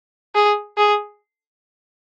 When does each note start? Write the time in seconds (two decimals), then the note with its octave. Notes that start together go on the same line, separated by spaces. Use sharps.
0.35 G#4
0.77 G#4